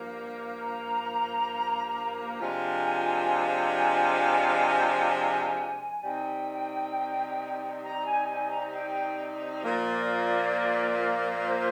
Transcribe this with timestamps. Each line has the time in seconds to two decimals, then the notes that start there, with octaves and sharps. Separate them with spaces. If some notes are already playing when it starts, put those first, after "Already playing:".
Already playing: G2 F3 A#3
0.60 A#5
2.41 C3 F3 G#3 D4 F4 G#5
6.02 C3 G3 C4 D#4 G5
7.83 A#5
8.06 G#5
8.28 G#5
8.51 A#5
8.73 G5
9.64 A#2 F3 A#3 D5
11.45 C5